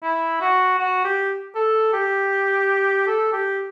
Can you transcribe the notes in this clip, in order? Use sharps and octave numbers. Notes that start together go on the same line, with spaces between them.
E4
F#4
F#4
G4
A4
G4
A4
G4